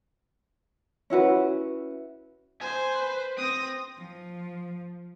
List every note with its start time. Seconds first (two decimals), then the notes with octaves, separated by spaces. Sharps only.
1.10 C#4 E4 F#4 B4
2.61 C5 G#5
2.95 B4
3.38 C4 D#6 A#6
3.97 F3